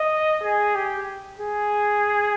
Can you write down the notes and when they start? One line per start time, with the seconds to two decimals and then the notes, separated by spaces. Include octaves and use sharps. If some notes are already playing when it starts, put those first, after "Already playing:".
Already playing: D#5
0.43 G#4
0.75 G4
1.40 G#4